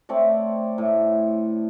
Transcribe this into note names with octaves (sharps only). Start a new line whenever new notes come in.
A3 C4 C#5 D5
A2